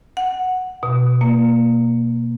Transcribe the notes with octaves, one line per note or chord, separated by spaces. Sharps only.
F#5
B2
A#3